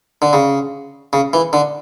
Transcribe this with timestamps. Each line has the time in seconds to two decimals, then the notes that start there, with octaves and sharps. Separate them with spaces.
0.22 D3
0.33 C#3
1.13 C#3
1.33 E3
1.53 D3